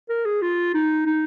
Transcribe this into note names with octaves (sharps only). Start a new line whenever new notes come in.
A#4
G#4
F4
D#4
D#4